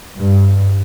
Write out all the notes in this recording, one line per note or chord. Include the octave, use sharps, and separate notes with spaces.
G2